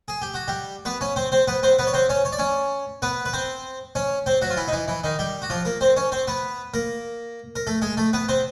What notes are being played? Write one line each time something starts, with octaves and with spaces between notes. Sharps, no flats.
G#4
G4
F#4
G3 G4
B3 B4
C#4 C#5
C4 C5
C4 C5
B3 B4
C4 C5
B3 B4
C#5
C4 C5
C#4 C#5
C#5
D5
C#4 C#5
B3 B4
B4
C4 C5
C#4 C#5
C4 C5
F#3 F#4
F4
E3 E4
D#4
E3 E4
E3 E4
D#3 D#4
G3 G4
F#4
F3 F4
A#3 A#4
C4 C5
C#4 C#5
C4 C5
B3 B4
A#3 A#4
A#4
A3 A4
G#3 G#4
A3 A4
B3 B4
C4 C5